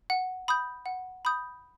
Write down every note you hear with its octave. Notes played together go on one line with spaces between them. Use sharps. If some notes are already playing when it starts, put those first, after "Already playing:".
F#5
B5 D#6 G6
F#5
B5 D#6 G6